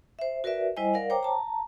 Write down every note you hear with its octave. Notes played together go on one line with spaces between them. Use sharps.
C5 E5
F#4 A#4 B4 D5 E5
G3 E4 C5 D#5 G#5
A#4 D5 F5 F#5
C5 C#5 G5 A#5 D6
A5 A#5